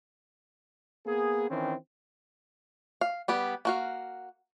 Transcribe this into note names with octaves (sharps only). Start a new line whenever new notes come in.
A#3 B3 G#4
D#3 E3 C4 C#4
F5
G3 B3 G4
A#3 F#4 F5